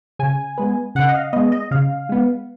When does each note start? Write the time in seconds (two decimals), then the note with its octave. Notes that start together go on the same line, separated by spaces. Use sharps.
0.19 C#3 G#5
0.58 G#3 B3
0.95 C#3 F#5
1.09 D#5
1.15 F5
1.33 G#3 B3 D#5
1.52 D#5
1.71 C#3 F5
2.09 G#3 B3